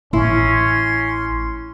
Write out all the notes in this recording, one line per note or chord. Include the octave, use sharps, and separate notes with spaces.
A1 C#4 E4 C6